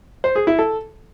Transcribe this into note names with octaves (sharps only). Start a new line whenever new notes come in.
C5
G#4
E4
A4